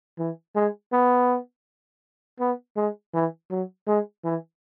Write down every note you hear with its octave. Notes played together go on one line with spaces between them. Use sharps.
E3
G#3
B3
B3
G#3
E3
F#3
G#3
E3